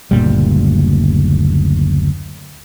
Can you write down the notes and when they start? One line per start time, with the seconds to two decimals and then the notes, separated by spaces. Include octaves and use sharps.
0.11 F#1 D2 A#2 G3